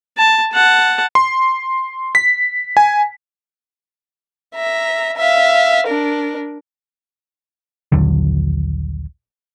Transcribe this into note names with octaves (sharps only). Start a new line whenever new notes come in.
A5
F#5 A5
C6
B6
G#5
E5 A#5
E5 F5
D4 A#4
A#1 D#2 D3 F#3